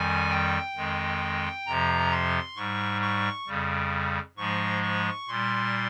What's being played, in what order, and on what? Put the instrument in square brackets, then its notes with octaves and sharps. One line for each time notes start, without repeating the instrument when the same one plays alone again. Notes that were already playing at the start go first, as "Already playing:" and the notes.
Already playing: [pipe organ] F2 D#3 G3 G#5
G5
F2 D#3 G#3
F2 C3 F3 A#5
C6
G#2 G3 C#6
C#6
F2 C#3 G3
G#2 F3 G#3 C#6
C#6
A#2 G3 C6